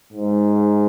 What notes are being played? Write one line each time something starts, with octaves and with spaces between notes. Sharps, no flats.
G#2